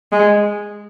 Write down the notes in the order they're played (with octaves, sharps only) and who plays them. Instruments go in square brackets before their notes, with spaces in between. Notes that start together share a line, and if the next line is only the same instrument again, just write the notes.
[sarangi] G#3